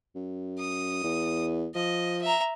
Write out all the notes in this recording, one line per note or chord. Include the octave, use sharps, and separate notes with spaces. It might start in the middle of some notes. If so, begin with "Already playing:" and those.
F#2
D#6
E2
F3 D#5
E5 A#5